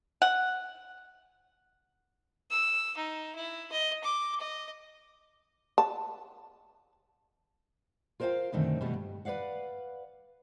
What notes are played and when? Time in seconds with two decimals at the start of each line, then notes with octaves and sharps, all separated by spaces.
0.22 F#5
2.51 E6
2.97 D#4
3.35 E4
3.72 D#5
4.03 D6
4.40 D#5
5.78 A5
8.20 F4 A#4 C5 C#5 F5 G5
8.52 F#2 B2 D3 D#3 A3 C4
8.81 B2 G3 A3 B3 F#4
8.93 G2
9.25 B4 C#5 D5 F5 F#5